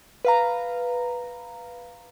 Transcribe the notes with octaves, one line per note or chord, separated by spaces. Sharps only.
B4 F5 A#5